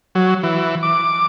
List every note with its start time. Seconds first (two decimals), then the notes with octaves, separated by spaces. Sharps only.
0.15 F#3
0.43 E3
0.83 D6